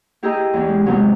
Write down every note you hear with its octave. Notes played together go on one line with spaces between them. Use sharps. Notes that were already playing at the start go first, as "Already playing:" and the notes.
E4 G4 G#4 D#5 A#5 E6
E2 C#4
G#3
C3 F#3 G#3 B3